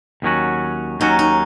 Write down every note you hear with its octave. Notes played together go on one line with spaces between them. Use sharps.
D#2 D#3 F#3 C#4 F#4
D#2 D#3 F#3 C#4 D#4 F#4
D#4